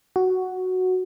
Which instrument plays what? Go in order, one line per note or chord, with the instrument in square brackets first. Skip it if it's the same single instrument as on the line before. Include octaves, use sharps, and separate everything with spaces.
[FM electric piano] F#4